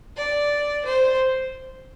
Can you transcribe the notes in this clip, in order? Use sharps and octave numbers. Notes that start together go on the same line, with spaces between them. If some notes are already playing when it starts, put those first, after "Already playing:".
D5
C5